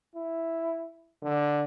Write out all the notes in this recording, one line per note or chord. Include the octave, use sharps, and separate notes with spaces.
E4
D3